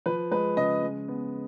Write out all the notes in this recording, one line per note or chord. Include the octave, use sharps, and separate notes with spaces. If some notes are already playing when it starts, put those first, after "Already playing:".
F3 B4
G#3 B4
C#3 D#5
G#3
B3